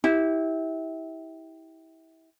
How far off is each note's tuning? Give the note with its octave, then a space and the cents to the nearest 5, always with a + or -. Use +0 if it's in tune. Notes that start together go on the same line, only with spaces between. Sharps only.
E4 -25 G4 +0